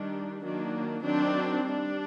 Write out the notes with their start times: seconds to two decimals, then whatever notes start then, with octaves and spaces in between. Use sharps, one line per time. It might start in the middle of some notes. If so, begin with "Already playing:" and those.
Already playing: D#3 G3 D4
0.44 D#3 F#3 A#3 D4
1.04 D#3 F#3 C4 D4
1.64 G3 D4